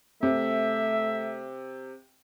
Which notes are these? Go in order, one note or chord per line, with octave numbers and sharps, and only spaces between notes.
C3 A3 E5